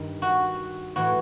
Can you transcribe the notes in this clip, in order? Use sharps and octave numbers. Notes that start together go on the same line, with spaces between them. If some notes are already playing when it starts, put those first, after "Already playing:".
Already playing: G2 D#3
F#4
A2 E3 F#4